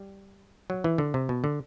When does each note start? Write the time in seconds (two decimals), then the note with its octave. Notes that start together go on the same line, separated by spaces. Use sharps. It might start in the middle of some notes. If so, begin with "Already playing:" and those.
Already playing: G3
0.70 F#3
0.84 E3
0.98 D3
1.14 C3
1.29 B2
1.44 D3